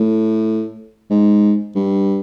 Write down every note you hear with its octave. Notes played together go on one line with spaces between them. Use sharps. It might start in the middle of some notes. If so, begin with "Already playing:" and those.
Already playing: A2
G#2
G2